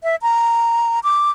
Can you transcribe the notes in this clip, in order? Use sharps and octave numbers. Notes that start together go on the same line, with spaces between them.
E5
A#5
D6